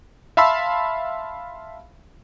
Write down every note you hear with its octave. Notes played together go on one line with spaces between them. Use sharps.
E5 F5 A5 B5 C6 E6